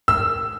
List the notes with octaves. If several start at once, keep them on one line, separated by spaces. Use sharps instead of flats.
E6